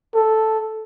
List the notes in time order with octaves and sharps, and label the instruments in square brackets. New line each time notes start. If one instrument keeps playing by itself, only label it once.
[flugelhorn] A4